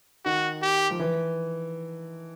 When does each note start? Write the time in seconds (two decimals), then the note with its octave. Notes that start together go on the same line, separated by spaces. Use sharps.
0.25 D#3 F#4
0.62 G4
0.91 F3
0.99 E3